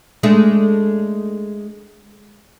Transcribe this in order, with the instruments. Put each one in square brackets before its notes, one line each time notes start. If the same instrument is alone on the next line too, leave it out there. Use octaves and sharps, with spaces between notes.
[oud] G#3 A3 D4